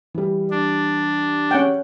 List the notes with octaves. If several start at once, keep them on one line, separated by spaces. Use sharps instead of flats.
E3 G3
D4
C#4 F#5 G5